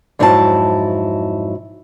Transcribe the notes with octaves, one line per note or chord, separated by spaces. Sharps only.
F2 G#2 F#3 E4 F4 A5